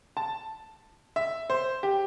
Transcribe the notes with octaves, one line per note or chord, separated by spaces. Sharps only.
A5
E5
C5
G4